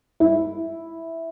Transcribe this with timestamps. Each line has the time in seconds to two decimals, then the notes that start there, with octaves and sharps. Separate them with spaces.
0.20 E4